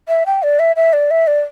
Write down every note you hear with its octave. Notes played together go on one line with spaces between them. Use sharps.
E5
G5
D5
E5
E5
D5
E5
D5